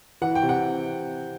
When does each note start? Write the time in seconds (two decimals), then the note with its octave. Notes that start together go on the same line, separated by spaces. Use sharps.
0.22 E3 F#5
0.35 G5
0.43 C3
0.49 F#5